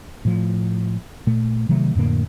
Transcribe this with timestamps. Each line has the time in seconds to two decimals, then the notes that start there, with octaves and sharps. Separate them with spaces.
0.25 A2 F3
1.27 A#2 A3
1.69 C3 D#3 F#3 A3
1.95 F2 A2 D3 A#3